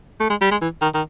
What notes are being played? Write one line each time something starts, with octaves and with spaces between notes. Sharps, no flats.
A3
G#3
G3
G#3
E3
D#3
D#3